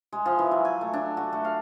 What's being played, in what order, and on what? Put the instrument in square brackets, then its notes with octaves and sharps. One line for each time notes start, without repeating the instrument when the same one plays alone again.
[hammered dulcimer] G#3
F3
E3
F#3
G#5
A3
D4
F#4
A3
F5